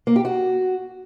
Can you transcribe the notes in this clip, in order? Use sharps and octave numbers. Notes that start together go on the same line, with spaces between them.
A#3
G4
F#4